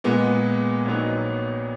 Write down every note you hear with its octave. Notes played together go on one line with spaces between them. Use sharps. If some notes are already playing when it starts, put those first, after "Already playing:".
A#2 G#3 B3
A#1 A#2 F#3 B3 D#4